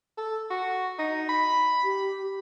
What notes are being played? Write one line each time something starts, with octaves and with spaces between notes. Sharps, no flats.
A4
F#4
D#4
B5
G4